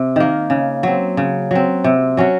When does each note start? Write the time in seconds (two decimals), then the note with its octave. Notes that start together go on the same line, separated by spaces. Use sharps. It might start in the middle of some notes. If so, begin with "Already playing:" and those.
Already playing: C3
0.16 D#3 A#3
0.50 C#3
0.83 F#3 C4
1.17 C#3
1.51 F#3 C4
1.84 C3
2.17 F#3 C#4 F#4